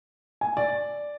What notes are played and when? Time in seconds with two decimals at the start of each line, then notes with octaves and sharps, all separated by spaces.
0.41 G#5
0.57 D5